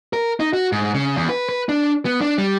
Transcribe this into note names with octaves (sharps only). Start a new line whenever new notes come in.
A#4
D#4
F#4
G#2
C#3
E2
B4
B4
D4
B3
D4
G3